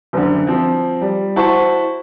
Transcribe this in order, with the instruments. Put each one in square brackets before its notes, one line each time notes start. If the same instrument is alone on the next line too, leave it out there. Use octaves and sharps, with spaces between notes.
[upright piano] F#1 D3
F3 C4
G3
E4 F#4 C5 A5 C#6